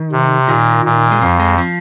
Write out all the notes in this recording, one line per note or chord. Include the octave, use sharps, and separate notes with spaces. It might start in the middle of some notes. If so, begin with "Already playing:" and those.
Already playing: D#3
C3
A#2 D#3
A#2
G#3
F2 F3
G#3
F3